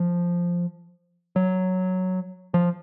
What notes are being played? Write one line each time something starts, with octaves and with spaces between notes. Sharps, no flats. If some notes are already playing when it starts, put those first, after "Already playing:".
Already playing: F3
F#3
F3